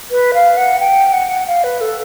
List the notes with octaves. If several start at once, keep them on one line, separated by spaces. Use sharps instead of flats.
B4
F5
F#5
G5
F#5
F5
B4
A4